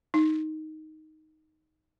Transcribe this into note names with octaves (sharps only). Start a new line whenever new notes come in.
D#4